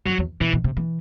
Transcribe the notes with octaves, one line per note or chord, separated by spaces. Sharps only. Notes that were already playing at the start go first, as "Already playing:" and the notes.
F#2 F#3
E2
B2 E3
B2
C3
E3